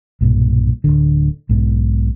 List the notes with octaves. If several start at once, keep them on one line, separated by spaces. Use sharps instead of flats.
B1 G2 A#2
D1 B1 D3
B1 G#2 B2